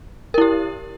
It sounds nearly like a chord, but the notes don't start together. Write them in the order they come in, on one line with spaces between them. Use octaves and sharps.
A#4 E4 G4